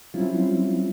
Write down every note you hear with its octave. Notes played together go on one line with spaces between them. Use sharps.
F#3 G3 C4 C#4 E4 F4